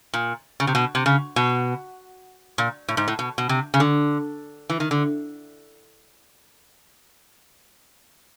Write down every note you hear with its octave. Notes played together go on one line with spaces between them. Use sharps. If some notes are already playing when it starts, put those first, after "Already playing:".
A#2
C#3
C3
B2
C3
C#3
B2
A#2
A2
G#2
A2
B2
B2
C3
C#3
D3
E3
D#3
D3